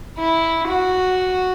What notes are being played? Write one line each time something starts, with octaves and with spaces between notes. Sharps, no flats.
E4
F#4